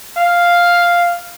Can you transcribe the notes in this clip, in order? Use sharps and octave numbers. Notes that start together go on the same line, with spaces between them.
F5